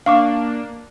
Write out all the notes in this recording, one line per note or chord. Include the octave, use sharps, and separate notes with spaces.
A#3 D4 F5 C#6 D6